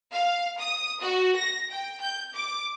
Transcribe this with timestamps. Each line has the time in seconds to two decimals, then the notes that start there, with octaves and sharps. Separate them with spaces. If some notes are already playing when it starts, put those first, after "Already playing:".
0.12 F5
0.60 D#6
1.02 F#4
1.36 A#6
1.70 G5
2.01 G6
2.34 D6